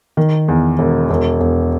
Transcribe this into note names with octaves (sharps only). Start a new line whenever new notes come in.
D#3
E2
E1
E1
E1